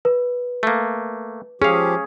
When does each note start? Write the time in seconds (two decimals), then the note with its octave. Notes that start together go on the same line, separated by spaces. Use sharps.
0.05 B4
0.63 A3 A#3
1.62 F3 C#4 G4 G#4 F5